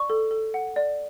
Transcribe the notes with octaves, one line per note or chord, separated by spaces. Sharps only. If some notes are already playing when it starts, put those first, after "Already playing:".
Already playing: D5 C#6
A4
A4
F#5
D5